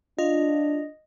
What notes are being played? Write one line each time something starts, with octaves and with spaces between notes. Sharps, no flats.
D4 F4 D#5